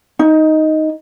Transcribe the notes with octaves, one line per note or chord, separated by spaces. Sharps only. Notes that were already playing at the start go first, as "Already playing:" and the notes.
D#4